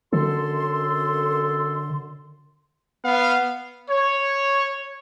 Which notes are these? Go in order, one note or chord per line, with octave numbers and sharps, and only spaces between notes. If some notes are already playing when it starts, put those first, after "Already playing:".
F#2 D3 A4 C6
B3 F5
C#5